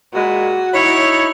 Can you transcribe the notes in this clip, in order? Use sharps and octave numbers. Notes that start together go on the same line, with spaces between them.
A#2 G#3 F#4 B5
D#4 E4 C#5